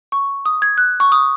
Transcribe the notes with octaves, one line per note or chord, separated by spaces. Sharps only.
C#6
D#6
G#6
F#6
C#6
D#6